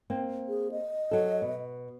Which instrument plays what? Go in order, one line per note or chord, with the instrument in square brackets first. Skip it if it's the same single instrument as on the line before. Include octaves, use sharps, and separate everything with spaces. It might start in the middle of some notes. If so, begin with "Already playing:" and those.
[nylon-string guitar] A#3 C4
[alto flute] G#4
D#5
[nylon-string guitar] F#3 A4
B2